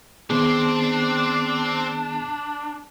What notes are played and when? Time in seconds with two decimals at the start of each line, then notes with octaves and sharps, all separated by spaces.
0.30 D#3 B3 C4 D4 G#4 C5